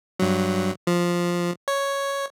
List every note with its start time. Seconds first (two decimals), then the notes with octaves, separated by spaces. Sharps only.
0.19 G2 F#3
0.87 F3
1.68 C#5